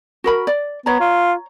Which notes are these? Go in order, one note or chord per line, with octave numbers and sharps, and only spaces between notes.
F#4 A#4 B5
D5
B3 C#5 A#5
F4